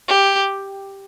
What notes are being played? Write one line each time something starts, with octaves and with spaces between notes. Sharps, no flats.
G4